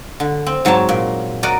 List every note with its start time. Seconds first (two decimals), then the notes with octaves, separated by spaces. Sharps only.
0.20 D3
0.46 C4
0.65 G#2 F#3 C4 C#5 A5
0.89 A#2
1.43 F#4 A#4 D5 D#5 F#5